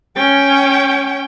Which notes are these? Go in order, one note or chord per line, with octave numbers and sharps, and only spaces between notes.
C#4 G5